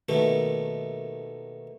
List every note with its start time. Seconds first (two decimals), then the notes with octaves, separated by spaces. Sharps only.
0.09 D#2 B2 D#3 A3